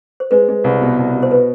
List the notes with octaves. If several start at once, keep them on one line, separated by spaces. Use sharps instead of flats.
C5
G#3 B4
G#3
C2
B2
C2
B2
C5
B4